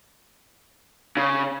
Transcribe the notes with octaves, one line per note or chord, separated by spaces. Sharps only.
C#3